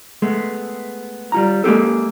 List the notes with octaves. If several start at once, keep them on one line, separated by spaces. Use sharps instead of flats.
G#3 A3 B3
G3 F4 A#5
G#3 A#3 D#4 G4 A4